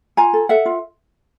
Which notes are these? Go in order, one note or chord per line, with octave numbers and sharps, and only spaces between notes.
F4 G#5 A#5
A4
A4 E5 F#5
F4